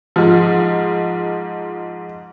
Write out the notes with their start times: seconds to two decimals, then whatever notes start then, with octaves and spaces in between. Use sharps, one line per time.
0.16 G#2 F3